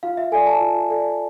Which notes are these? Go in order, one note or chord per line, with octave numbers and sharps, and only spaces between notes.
F4 F5
E5
A4 D5 G#5
A5
F4
A4 D5